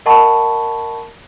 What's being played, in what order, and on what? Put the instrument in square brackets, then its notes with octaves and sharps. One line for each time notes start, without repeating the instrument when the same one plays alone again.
[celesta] A#4 D#5 F#5 A5 B5 C#6